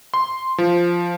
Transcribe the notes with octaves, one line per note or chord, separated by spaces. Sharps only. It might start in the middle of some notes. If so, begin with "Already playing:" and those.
C6
F3